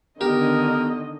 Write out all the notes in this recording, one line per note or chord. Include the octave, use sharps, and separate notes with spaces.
D3 D#3 B3 G4 A#4 D#5